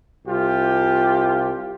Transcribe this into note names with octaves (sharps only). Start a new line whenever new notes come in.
C2 F4 G4